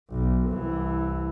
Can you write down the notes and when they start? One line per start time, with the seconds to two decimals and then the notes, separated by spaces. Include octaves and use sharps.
0.11 B1
0.49 C2 E3